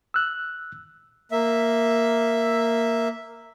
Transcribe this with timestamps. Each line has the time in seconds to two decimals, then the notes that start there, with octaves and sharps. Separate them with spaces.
0.14 E6 F#6
1.32 A#3 E5